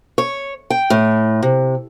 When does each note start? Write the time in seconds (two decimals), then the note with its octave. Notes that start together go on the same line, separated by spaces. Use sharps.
0.18 C#5
0.70 G5
0.90 A2
1.43 C3